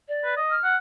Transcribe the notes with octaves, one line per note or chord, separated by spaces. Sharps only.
D5
B4
D#5
F6
F#5